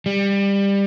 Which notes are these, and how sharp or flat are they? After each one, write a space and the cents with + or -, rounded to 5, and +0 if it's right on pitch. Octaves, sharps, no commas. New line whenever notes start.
G3 +20